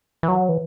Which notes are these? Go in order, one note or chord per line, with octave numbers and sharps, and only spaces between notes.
E3
F#3
E3